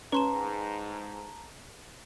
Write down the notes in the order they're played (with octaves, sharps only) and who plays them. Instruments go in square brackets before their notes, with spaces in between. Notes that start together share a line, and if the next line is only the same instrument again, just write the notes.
[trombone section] G#2 [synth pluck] C#4 C#5 [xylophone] B4 C6 E7 [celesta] A5 A#5